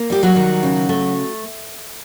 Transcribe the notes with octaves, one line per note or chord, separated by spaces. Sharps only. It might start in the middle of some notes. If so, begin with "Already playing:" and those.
Already playing: A#3
G3 G4
F#3 F#4
D#3
C#3
A3